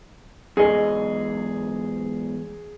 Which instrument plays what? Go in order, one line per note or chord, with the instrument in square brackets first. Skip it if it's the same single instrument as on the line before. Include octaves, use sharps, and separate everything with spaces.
[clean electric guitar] E2 G#2 D#5 [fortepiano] G#4